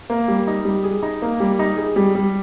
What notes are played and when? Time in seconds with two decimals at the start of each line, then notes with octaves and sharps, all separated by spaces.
0.10 A#3
0.28 G3
0.47 D#4
0.65 G3
0.84 G#4
1.03 D#4
1.22 A#3
1.40 G3
1.59 D#4
1.77 G#4
1.96 G3
2.15 G3